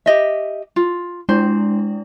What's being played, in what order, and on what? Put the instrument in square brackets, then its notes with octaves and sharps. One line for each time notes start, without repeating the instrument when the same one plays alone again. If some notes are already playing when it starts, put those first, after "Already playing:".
[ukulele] G4 D#5 E5
F4
[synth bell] G#3 D4 E4 [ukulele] C5